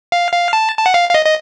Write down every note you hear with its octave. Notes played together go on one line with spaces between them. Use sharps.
F5
F5
A5
A5
F#5
F5
F5
D#5
D#5